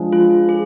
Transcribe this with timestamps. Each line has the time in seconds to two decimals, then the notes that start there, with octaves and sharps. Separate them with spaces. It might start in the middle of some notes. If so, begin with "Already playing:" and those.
Already playing: F3 G#3 D4 G#4
0.13 F4
0.49 G#4